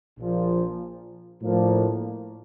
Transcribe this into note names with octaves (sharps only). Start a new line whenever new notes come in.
A#1 A#2 F3
A2 F3 A#3 D4